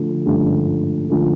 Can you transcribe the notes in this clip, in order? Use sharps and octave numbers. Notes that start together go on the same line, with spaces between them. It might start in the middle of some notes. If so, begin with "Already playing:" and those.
Already playing: D3 F3 A3
G2 D3 F3 A3 C#4
D3 F3 A3 C#4